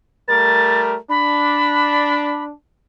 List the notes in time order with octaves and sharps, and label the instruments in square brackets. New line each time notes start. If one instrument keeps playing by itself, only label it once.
[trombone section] G3 A3 A#4 [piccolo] A6
[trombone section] D4 [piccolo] B5